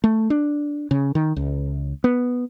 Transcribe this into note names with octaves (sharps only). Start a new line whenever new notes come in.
A3
D4
C#3
D#3
C#2
B3